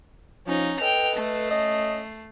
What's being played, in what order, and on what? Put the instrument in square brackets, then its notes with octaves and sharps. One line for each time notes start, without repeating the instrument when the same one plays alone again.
[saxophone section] F3 [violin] C#4 D#4
[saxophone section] A4 B4 D#5 [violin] G5 F7
[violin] A3 C7
[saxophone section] C#4 D#5